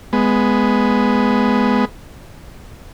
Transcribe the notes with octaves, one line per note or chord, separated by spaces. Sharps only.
G#3 B3